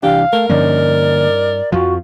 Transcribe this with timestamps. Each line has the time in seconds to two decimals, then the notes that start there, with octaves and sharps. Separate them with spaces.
0.03 C2 E3 D4 G4 F5
0.33 A3 A#4
0.50 G2 D3 F3 A#3 C#4 D#4 D5
1.72 F2 F3 F4 F#4